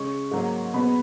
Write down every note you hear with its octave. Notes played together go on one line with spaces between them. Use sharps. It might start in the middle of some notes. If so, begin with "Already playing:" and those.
Already playing: C#3 G#3 C#4 C#6
G#2 F#3 A#3
B2 G#3 B3 B5